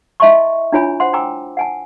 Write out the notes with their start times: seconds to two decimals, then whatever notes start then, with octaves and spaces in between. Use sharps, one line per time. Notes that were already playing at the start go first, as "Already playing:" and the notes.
0.20 E4 D#5 E5 A5 C6 C#6
0.72 D4 E4 F4 C#5 G#5 B5
1.00 C5 F#5 C6
1.13 G5 G#5 A#5 D6 E6
1.57 F#5 G#5 A5